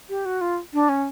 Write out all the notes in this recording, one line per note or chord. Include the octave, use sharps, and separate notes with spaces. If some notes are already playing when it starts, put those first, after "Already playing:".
G4
F#4
F4
D4
C#4